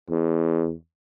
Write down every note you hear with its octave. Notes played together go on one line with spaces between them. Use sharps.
E2